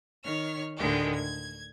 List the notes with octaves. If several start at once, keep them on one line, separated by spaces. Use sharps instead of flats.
D#3 C#5 F6
D2 A2 D3 D#3 G#3 G4
G#6